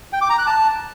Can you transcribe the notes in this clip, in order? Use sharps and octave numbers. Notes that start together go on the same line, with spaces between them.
G5
D6
A#5
F#6
A5